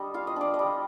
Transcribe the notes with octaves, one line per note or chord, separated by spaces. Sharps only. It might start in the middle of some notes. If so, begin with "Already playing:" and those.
Already playing: G3 D4 D#5
F4 F5
D#5
D4 D5
D#5
G3